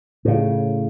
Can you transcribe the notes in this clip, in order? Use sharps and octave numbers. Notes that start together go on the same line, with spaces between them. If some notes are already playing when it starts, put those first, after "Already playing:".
A2 C#3